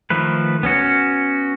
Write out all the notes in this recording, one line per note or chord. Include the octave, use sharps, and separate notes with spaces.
D#3 F3 A3 B4
B3 C#4 F#4